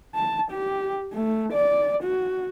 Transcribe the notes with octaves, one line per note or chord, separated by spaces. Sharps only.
A5
G4
A3
D5
F#4